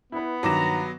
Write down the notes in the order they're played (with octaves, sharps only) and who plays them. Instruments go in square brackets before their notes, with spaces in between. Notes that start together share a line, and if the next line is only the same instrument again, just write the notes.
[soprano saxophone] B3 [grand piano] E4 B4
[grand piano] G2 D#3 E7 [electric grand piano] F#3 D6 A#6 [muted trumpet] A#5